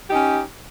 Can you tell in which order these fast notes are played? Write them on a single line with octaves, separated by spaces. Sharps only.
G4 D#4 C#4